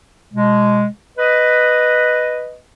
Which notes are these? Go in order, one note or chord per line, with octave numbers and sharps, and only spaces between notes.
B2 G#3
B4 D#5